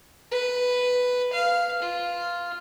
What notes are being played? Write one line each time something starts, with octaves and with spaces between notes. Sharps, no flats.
B4
F5
F4